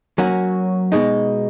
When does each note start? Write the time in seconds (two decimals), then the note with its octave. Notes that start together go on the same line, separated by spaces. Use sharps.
0.18 F#3 A#3 C#4 F#4
0.92 B2 G#3 D#4